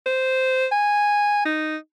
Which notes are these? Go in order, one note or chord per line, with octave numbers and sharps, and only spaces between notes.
C5
G#5
D#4